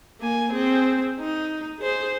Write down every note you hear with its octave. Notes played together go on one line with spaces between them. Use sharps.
A#3 G#5
C4 G#4
D#4
G#4 C5